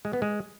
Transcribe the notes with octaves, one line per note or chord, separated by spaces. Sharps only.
G#3
B3
G#3